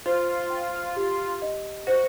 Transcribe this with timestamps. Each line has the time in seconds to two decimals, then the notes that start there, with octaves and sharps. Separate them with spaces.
0.06 F4 C5
0.50 G5
0.97 G4
1.42 D#5
1.87 F#4 C5